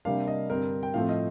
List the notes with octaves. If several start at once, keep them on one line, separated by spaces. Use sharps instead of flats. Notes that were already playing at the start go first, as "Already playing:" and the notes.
C3 G3 A#3 D4 F5
D#5
G2 D3 G3 C4 A#4
G5
A2 F3 A3 C4 F5
D#5